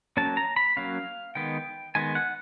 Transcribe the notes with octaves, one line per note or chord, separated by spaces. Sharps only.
F#3 A#3 C#4 A5
A#5
B5
F#3 A#3 C#4 F5
D#3 G#3 B3 G5
D#3 G#3 B3 G#5
F#5